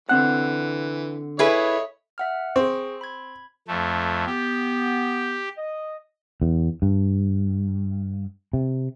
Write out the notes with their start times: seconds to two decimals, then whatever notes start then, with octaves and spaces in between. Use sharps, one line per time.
0.09 D3 E3 C4 F#5 F#6
1.39 E4 G#4 A4 B4 C#5 D#5 E5 B5
2.18 E5 F#5 F6
2.56 C4 G#4 C#6
3.01 B5 G#6
3.68 F2 A3
4.27 B3 G4
5.57 D#5
6.42 E2
6.82 G2
8.53 C3